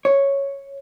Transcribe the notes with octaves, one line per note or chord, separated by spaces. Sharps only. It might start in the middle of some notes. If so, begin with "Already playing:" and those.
C#5